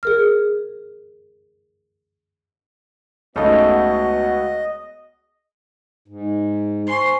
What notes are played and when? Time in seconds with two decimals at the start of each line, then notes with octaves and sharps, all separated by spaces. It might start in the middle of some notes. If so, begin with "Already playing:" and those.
0.03 G#4 A#4 F6
3.36 C#2 A3 B3 D#4 F#4 A4 D#5
6.08 G#2
6.87 C5 G#5 C6 C#6